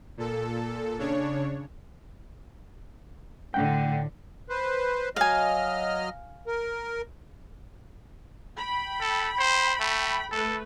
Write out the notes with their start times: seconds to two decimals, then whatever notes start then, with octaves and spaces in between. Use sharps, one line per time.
0.17 A#2 A4
0.99 C#3 D4 C#5
3.54 A2 D3 F#5 G5
4.50 B4 C5
5.16 F#3 D#5 F5 G#5 F6
6.47 A#4
8.57 G5 B5
9.00 A4
9.38 C5
9.80 A3
10.32 A3 A4 B4